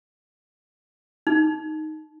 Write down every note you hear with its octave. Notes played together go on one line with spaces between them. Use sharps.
D#4